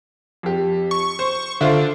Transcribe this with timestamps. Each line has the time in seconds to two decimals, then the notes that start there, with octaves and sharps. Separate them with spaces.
0.43 F2 G4
0.91 C#6
1.19 C5
1.61 D3 F4 C5 E5